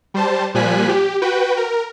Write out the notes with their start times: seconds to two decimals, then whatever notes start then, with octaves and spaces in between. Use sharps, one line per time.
0.14 G3 C5 A5
0.54 A#2 F3 G3 G#5 F#6 B6
0.89 G4
1.22 F#4 B4 G5
1.57 A#4